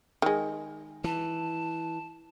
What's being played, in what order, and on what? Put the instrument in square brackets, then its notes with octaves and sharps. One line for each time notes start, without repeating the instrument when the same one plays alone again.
[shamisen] D#3 G#3
[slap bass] E3 [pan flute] A5